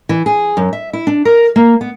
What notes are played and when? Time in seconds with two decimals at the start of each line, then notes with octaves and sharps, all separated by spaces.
0.09 E3
0.26 G#4
0.57 F#2
0.73 E5
0.93 E4
1.07 D4
1.25 A#4
1.56 A#3
1.81 B3